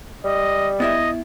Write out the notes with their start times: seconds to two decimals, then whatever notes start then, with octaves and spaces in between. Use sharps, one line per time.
0.25 G3 D#5
0.80 B3 E4 D#5 E5